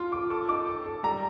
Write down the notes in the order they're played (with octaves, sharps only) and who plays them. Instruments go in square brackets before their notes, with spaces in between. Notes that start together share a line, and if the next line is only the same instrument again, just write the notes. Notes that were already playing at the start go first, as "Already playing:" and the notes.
Already playing: [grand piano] F4 [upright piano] C6
[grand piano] F4 [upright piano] D6
[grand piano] A4 [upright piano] D6
[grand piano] D#4 [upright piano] D6
[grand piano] A4
A4
[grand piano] G3 [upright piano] A#5